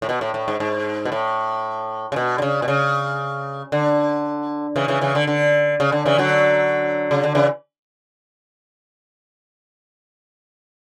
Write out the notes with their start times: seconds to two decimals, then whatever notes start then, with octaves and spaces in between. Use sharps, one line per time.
0.02 A2
0.09 B2
0.21 A2
0.34 A2
0.48 G#2
0.60 G#2
1.05 B2
1.12 A2
2.12 C#3
2.16 B2
2.38 D3
2.42 C#3
2.62 B2
2.68 C#3
3.72 D3
4.76 C#3 E3
4.88 C#3 E3
5.01 C#3 E3
5.15 D3
5.27 D3
5.80 C#3
5.92 D3
6.06 C#3 E3
6.18 D3 F#3
7.11 C#3
7.24 D3
7.35 C#3 E3